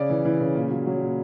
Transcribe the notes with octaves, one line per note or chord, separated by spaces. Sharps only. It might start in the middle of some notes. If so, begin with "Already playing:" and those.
Already playing: C#3 D5
E3
E3
C#3
A#2
F#3
F#3
A#2